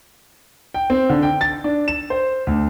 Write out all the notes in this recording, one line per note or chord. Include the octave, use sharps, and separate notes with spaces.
G5
C4
D3
G5
A6
D4
E7
C5
D2